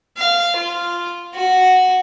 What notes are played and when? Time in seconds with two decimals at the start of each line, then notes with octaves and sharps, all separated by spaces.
0.18 F5
0.57 F4
1.35 F#4